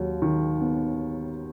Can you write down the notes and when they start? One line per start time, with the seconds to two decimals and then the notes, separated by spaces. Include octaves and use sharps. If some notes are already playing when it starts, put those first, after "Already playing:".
Already playing: D#2 F#3
0.22 D#3
0.61 B3